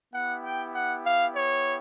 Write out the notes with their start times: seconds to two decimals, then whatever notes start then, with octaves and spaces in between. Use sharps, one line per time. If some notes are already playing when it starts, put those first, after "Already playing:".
0.14 B3 E4 G4 F#5
0.45 G5
0.75 F#5
1.05 F5
1.36 C#5